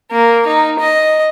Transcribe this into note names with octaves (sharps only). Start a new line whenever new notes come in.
A#3
D#4
D#5